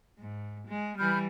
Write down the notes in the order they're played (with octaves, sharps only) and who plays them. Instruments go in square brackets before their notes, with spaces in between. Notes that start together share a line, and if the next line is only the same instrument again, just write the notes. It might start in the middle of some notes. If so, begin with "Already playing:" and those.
[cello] G#2
G#3
[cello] E3 G3 [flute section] B5 F6 G6